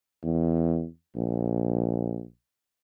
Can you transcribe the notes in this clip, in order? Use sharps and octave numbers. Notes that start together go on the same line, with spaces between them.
E2
A#1